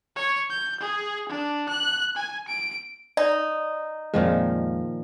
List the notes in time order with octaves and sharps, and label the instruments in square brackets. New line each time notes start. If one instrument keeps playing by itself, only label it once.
[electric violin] C#5
G6
G#4
D4
F#6
G#5
D7
[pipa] D#4 [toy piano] D5
[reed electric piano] F2 G#3 [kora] A#2 D#3 F3